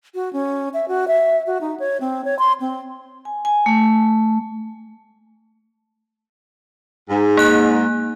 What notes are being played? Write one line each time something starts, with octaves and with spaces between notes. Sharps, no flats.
F#4
C#4
E5
F#4
E5
F#4
D#4
C#5
C4
C#5
C6
C4
G#5
G#5
A3
G#2
A#3 F#6